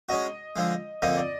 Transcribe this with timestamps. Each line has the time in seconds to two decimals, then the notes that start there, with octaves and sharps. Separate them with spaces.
0.09 G#3 C#4 F#4 D#5
0.56 D3 F3 G#3
1.02 F2 D3 F3 A#3 D#5
1.17 D5